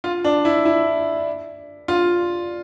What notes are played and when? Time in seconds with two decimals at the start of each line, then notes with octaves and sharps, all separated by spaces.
0.04 F4
0.24 D4
0.45 E4
0.65 E4
1.88 F4